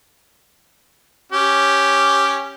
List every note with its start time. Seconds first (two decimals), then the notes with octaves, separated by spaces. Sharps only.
1.32 C#4 G4